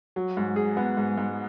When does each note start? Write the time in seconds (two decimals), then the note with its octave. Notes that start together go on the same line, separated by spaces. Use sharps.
0.16 F#3
0.37 G#2
0.56 G#4
0.77 B3
0.97 G#2
1.18 G#2